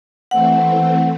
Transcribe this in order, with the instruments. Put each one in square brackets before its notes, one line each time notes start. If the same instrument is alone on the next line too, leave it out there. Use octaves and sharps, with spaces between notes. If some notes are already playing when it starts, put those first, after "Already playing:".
[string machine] E3 A3 C4 [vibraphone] F#5